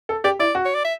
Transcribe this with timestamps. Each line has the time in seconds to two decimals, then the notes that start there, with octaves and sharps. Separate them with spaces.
0.09 A4
0.24 G4 D5
0.39 E4 D5
0.55 F#4
0.65 C#5
0.75 D5
0.84 E5